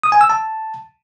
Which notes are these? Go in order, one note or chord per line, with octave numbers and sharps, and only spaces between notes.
D#6
G#5
E6
A5